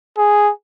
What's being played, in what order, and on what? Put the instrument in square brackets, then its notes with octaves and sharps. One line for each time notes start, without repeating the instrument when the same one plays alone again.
[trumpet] G#4